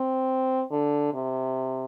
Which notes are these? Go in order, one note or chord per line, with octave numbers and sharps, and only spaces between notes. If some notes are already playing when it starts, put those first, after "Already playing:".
Already playing: C4
D3
C3